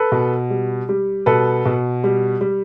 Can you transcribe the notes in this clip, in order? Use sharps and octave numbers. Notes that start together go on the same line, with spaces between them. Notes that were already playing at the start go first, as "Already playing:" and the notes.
Already playing: A4 B4
B2
G3
G3
B2 A4 B4
B2
G3
G3